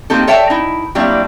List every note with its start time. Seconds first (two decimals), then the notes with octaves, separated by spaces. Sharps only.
0.10 A#3 C4 D#4 G4 A4
0.27 A4 C#5 D5 E5 G5 A5
0.50 D#4 E4
0.95 F#3 G3 A#3 C4 D4 E4